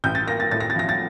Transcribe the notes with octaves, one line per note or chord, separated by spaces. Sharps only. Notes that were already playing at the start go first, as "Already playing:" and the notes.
A1 G6
A6
A#3 A#6
A6
A2 A6
A#6
A6
F3 A#6
A6